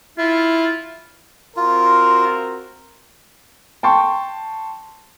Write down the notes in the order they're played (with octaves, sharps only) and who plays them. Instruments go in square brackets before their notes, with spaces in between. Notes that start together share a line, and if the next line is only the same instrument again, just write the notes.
[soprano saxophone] E4 [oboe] F4
[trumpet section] C4 F#4 A#4 [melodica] F4
[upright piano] G5 A5 C6 C#6